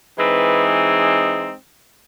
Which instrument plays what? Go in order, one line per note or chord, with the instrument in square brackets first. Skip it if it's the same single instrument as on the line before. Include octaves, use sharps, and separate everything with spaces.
[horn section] E3 G#3 C4 D#4 B4